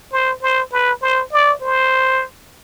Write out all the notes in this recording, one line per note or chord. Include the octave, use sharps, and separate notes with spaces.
C5
C5
B4
C5
D5
C5